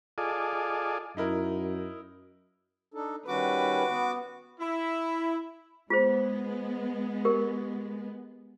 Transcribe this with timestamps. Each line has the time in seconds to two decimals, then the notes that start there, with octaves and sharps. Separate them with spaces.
0.18 F4 G#4 A4 D5 D#5
1.17 F#2 D#4 E4 A#4
2.94 D4 D#4 A4
3.28 D#3 G3 C#4 F#4 B4 D6
3.89 B3
4.60 E4
5.90 G#3 B3 F4 G#4 C5
7.25 G4 A#4